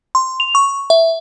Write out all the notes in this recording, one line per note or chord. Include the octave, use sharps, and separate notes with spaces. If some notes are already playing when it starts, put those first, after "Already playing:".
C6
F7
C#6
E5